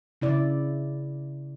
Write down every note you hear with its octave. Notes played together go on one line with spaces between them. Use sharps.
C#3 E4 D5